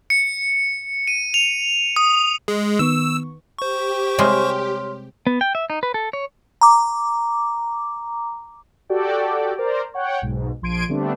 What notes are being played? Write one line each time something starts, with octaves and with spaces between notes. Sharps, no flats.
C#7
D#7
F7
D#6
G#3
D#3 B3 C#6 E6
G4 C5 C#6
C3 G3 G#3 C#5 C6 F6
B3
G5
E5
D#4
B4
A4
C#5
A#5 D6
F#4 G4 A4 D5 G5
A#4 C5 D5 A#5
C#5 F#5 G5
B1 G#2 B2
A#1 F3 C6 G#6 D7 D#7
D3 G3 A3 B3 C4 D4